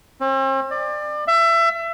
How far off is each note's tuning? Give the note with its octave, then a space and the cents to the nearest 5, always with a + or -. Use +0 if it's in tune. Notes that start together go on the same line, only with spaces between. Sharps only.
C4 +45
D5 +30
E5 +25